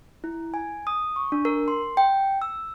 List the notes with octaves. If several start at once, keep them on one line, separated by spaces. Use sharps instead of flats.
E4
G#5
D#6
C#6
D4
A#4
C6
G5
E6